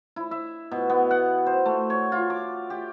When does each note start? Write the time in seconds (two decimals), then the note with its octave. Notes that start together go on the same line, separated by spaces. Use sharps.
0.16 E4
0.31 E5
0.71 B2
0.90 B3
1.11 F#5
1.46 C5
1.66 A3
1.90 C#5
2.12 F4
2.30 D6
2.70 G4